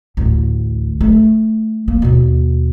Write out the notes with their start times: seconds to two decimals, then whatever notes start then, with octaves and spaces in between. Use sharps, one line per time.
0.17 A1 D2
1.01 A3
1.88 A#3
2.02 D#2 B2